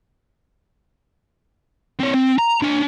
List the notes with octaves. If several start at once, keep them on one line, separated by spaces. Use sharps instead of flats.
C4 C#5
C4
A#5
D4 C#5